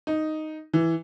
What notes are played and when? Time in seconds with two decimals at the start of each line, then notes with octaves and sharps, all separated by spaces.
0.07 D#4
0.73 E3